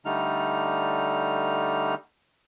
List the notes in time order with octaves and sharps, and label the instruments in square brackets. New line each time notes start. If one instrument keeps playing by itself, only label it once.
[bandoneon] D3 G3 A3 D#4 F6